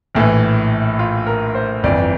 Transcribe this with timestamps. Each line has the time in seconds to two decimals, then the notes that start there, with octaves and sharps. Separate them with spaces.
0.15 A#1 A2 E3
0.99 F4
1.27 A#4
1.55 C5
1.83 G1 F2 E3 D5